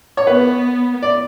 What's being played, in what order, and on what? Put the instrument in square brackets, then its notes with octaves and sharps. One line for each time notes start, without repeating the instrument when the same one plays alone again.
[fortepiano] C#5
[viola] B3 [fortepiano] B4
[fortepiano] D5